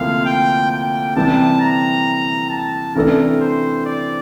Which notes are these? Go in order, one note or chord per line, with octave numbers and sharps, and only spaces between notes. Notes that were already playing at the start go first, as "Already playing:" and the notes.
Already playing: D2 C3 F3 A#3 E4 F5
G5
G5
C3 E3 G3 A5
A#5
A5
C3 E3 A3 D4 A4 A#4
C5
D5